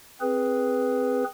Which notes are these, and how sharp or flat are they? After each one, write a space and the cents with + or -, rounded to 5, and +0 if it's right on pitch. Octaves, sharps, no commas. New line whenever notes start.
C4 +0 G#4 +0 B4 +0